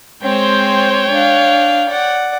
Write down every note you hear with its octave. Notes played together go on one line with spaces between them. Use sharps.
G#3 C4 C5 C#5 G5
D4 F5
D5 F#5